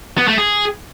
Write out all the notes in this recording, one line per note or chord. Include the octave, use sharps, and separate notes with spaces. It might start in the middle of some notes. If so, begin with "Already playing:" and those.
B3
A3
G#4